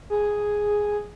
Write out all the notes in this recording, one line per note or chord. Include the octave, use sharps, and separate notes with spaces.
G#4